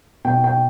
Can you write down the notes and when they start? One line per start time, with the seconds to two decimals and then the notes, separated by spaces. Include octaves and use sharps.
0.25 B2 G5
0.44 G5